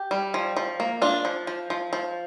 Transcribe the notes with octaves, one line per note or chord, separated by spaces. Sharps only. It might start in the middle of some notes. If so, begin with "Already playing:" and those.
Already playing: G4
G3
F3
F3
A#3
D4 F4
F3
F3
F3
F3